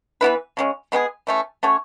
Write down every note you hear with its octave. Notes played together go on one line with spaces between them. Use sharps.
E3 B3 E4 B4
C#3 G#3 C#4
G#3 B3 D#4 G#4
E3 A3 C#4
A3 C#4 F#4 C#5